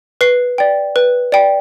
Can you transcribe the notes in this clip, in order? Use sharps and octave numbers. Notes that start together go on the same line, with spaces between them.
B4 C7
D5 G5
B4
D5 G5